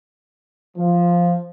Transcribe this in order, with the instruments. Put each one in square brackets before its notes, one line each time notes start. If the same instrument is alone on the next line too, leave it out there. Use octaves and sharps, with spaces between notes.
[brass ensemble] F3